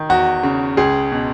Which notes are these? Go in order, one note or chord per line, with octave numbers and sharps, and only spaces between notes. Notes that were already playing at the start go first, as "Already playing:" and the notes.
Already playing: D#3
E2 F#4
C#3
C#2 G#4
B2